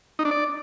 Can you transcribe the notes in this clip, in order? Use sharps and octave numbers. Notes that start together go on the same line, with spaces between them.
D#4
D4
D5